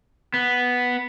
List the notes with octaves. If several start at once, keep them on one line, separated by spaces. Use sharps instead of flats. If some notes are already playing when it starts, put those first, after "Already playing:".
B3